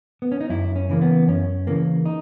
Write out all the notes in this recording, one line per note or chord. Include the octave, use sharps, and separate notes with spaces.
B3
C#4
D#4
F#2 E4
C#4
C#3 E3 A#3
B3
F#2 C#4
C#3 E3 A#3
D#4